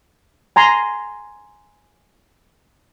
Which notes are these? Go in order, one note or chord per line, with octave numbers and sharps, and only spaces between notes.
G#5 A#5 C6